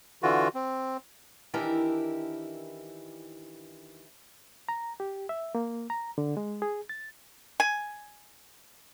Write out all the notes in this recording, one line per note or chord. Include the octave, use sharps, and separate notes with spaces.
D3 E3 F4 F#4
C4
D#3 E3 D4 E4 G4 A#4
A#5
G4
E5
A#3
A#5
D3
G#3
G#4
A6
G#5